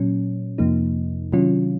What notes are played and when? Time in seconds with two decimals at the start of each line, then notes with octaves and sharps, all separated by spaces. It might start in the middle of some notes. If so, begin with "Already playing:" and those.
Already playing: A#2 F#3 C#4
0.58 F2 C3 F3 A#3 D#4
1.33 C3 D#3 F#3 C#4 F4